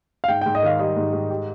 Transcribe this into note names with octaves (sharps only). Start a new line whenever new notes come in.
F5
G#2 G5
G#2 G5
D#5
D#3 F5
G3 D#5
G#2
G#2
G4